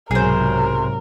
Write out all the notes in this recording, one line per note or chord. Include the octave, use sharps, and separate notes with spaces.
B1 G#2 C3 F#3 G#4 A#4 C5